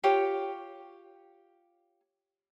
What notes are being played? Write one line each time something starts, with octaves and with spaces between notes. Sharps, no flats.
F4 G4 C#5